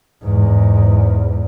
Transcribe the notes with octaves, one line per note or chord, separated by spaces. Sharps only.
E2 G#2